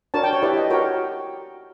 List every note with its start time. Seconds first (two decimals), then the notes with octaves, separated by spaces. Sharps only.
0.14 D4 F#4 A#4 C#5 A5
0.23 G5
0.33 C#5
0.42 E4 G4 B4 D5
0.57 D#5
0.70 F#4 A#4 C#5 G5